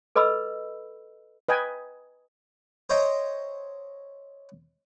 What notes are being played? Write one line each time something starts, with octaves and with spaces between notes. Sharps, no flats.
A4 B4 D#5 B5 E6
B4 D#5 G5 G#5
C5 C#5 D#5 E5 G5 A#5